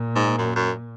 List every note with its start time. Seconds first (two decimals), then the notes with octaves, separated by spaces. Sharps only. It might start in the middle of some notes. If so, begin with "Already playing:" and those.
Already playing: A#2
0.16 G#2
0.38 F#2
0.56 F#2